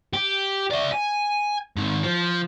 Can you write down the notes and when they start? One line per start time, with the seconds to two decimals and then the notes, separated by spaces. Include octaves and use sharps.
0.13 G4
0.71 D5 E5
0.92 G#5
1.76 G#2 D#3
2.03 F3